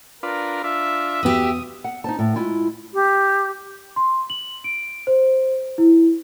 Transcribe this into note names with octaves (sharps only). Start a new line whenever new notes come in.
D4 F4 A#4 B4
D4 F4 E5
E2 B3 F#4 G4 D#6
F#5
D#4 C5 A5
A2
G#3 E4 F4
G4
C6
F#7
D7
C5
E4